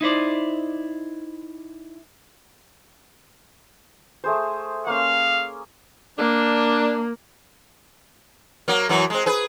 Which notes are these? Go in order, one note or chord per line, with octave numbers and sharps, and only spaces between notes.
D#4 E4 C5 D5
A3 G#4 C5
A#3 C#4 F5
A#3 D4
F#3 A#3
F#2 E3 F#3
G#3 C4
G#4 B4